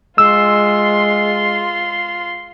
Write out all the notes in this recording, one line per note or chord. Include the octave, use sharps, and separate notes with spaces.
G#3 F4 C6 E6